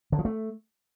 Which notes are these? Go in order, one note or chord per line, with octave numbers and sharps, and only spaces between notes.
D3
F3
A3